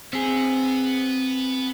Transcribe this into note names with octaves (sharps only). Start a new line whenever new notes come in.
B3 C4 G#4